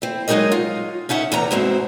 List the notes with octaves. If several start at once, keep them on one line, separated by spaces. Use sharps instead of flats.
C4 E4
F#3 G#3 D#4 G#4 A#4 D#5
F4
C#4 D#4 E5 F#5
E2 C3 A#5
G#2 B2 C4 E4